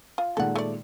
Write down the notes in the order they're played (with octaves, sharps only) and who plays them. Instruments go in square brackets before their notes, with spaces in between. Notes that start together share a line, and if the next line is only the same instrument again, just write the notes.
[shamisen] F4
[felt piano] A#2 D#3 G#3 [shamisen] A4 F#5
[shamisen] A3 D5